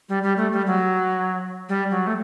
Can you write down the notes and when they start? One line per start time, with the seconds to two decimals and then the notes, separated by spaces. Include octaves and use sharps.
0.09 G3
0.23 G3
0.37 A3
0.52 G3
0.67 F#3
1.69 G3
1.91 F#3
2.07 A3